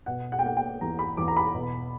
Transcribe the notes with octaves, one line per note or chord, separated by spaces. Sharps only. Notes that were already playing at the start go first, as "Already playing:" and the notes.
B2 F#5
F#5
G5
A#3 F#5
G5
E2 A#5
B5
E2 D6
A#5
B5
B2